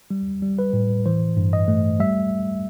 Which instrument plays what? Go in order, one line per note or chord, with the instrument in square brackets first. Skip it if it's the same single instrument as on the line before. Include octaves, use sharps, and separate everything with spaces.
[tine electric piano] G3
G3
B4
A2
E3 C5
G2
D#5
A3
G3 E5